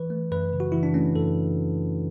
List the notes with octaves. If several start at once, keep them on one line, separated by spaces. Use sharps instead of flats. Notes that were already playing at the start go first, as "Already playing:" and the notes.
Already playing: E3 B4
A3
F#2 B4
C#3
F#4
E3 E4
D4
A3 C#4
F#2 A4